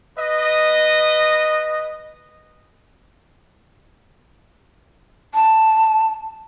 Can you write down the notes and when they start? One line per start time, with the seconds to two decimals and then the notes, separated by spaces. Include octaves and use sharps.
0.17 B4 D#5
5.35 A5